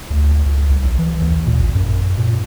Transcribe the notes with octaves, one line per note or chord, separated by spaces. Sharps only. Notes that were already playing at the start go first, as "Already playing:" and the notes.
D2
C#2
C2
B1
E3
D#2
A#2
A1
F#2
A#2